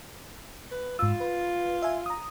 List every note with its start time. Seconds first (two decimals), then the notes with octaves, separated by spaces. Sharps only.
0.71 B4
0.99 G#2 F4 E6
1.20 B4
1.82 E5 G#5
2.06 A#5 D#6